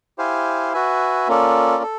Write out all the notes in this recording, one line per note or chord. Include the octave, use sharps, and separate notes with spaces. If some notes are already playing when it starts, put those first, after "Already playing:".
E4 G4 C5 F5 G#5
F#4 B4 E5 G#5
A#3 C#4 F4 A4 D5
A4